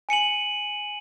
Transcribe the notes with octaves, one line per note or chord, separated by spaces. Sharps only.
G#5 C#7 D#7 F#7